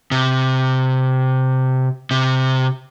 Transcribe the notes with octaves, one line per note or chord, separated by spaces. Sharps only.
C3
C3